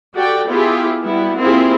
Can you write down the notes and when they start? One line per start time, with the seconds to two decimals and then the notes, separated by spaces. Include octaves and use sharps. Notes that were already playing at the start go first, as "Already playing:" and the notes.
0.15 F#4 G4 A4 D5 G5
0.50 B3 E4 F4 G4 G#4
1.06 G3 B3 E4 F#4
1.39 A#3 C4 E4 F4 G4 G#4